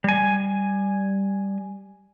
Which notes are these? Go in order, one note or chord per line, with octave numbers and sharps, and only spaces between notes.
G3 G#5